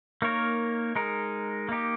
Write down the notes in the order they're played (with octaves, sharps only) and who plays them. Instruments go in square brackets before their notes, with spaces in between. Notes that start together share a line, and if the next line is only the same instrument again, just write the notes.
[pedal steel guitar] A#3 D#4 A#4 C#5
G#3 D#4 A#4
A#3 D#4 G4